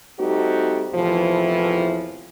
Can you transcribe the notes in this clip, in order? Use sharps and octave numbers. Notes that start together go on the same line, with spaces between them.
G3 A3 C4 D#4 F#4 G4
E2 A2 C3 E3 F3